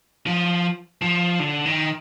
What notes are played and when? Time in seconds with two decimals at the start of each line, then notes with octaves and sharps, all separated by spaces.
0.27 F3
1.02 F3
1.39 D3
1.65 D#3